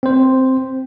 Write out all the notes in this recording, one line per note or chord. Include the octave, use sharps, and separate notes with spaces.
C4 C5